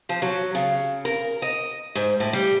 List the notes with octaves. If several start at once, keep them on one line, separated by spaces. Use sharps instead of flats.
F3
F#3
C#3
A#4
D#5
G#2
A2
G3